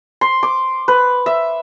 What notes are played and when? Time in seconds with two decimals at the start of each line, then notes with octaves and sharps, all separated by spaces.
0.21 C6
0.43 D6
0.88 B4
1.26 E5